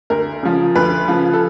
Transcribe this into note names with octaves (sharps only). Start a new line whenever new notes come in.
D2 A#4
C#3 F3
D2 B4
C#3 F3
A4